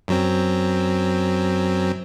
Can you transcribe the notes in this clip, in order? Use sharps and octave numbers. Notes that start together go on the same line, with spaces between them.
F#2 F#3 C4